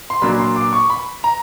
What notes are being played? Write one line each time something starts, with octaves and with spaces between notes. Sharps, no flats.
C6
A#2 F#3 A#3 D4 B5
C6
D6
C#6
B5
A#5